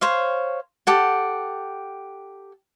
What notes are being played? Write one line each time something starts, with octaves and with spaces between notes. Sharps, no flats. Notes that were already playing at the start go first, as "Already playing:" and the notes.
C5 C#5 F5
G4 A4 F#5